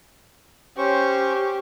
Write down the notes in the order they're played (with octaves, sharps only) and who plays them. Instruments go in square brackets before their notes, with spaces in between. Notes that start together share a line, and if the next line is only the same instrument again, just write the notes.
[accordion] C#4 C5 C#6 [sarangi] G4